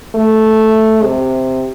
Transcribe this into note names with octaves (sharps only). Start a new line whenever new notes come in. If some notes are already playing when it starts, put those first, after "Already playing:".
A3
C3